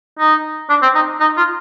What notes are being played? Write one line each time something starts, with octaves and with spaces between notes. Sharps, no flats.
D#4
D4
C4
D#4
D#4
F4